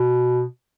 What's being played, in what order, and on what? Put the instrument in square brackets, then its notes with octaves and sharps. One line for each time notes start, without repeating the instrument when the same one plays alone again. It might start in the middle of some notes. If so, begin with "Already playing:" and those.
Already playing: [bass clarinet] B2